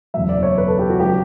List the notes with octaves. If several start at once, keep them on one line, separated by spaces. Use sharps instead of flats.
F#1 E2 B2 F#3 E5
D5
C#5
B4
A4
G4
F#4
C#3 F#3 G4